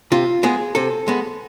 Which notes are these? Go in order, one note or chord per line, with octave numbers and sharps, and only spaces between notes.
C3 F4
G#3 B3 G#4
C3 A4
G#3 B3